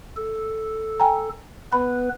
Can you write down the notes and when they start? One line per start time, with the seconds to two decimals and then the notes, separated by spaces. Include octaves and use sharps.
0.16 A4
1.00 G5 G#5 A#5
1.73 B3 B4 B5